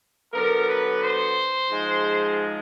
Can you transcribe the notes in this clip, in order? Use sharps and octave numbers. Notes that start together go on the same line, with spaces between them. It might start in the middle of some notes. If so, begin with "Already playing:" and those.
D3 F#3 B3 A#4
B4
C5
G#2 F3 G#3